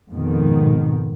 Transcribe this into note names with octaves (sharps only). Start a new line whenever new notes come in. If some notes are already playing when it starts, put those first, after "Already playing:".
F2 G#2 B2 D#3